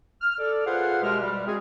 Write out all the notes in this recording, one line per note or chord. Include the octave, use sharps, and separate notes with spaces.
F6
A4 D5
F4 G#4 B4 C5 F5 F#5
B2 G#3 G4 A#4 E5 F6
G3
G#3 C4 F#4 G#4